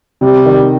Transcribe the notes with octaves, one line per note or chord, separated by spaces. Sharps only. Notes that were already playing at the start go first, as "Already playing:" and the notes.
C3 G3
D#3